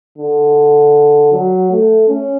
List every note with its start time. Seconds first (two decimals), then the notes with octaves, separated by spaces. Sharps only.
0.18 D3
1.32 F#3
1.71 A3
2.08 C#4